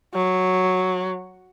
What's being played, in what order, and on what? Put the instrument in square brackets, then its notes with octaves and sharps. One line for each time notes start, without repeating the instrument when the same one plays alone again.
[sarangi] F#3